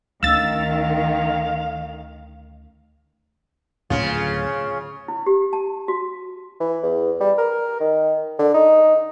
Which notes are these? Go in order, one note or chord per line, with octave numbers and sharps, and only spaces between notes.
D2 D#3 C#4 F5 E6 A6
D1 C#3 C#4 F4
E4
G4
A5
F#4
E3
E2
G3
A#4
D#3
D3
D#4